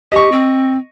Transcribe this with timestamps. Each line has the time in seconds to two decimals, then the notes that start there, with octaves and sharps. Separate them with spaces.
0.12 G4 D#5 C#6
0.32 C4